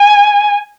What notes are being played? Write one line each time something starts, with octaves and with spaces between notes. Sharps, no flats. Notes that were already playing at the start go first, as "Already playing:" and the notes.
Already playing: G#5